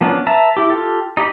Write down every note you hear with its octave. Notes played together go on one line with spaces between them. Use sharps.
F3 A#3 B3 C#4 D4
B4 E5 A5 A#5
E4 G4
F4 G4 A4
D#4 G4 A#5 B5